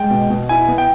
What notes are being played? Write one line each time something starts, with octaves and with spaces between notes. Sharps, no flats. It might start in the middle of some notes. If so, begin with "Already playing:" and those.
Already playing: G#3 G5
B2
B2
E4 G#5
B3
G5